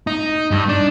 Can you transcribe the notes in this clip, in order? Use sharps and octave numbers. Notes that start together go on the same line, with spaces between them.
D#4
G2
D4